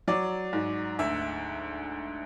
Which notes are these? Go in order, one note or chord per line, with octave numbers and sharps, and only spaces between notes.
F#3 D5
G#2
D2 E5